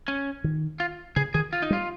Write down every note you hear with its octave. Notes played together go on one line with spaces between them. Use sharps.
C#4
D#3
F4
C#3 G#4
D#3 G#4
F4
D#4
G3 F4